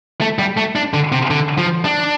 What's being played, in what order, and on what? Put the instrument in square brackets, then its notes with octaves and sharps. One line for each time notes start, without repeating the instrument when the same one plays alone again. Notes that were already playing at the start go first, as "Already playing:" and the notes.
[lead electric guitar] A3
G3
A3
D4
D3
C3
D3
F3
D4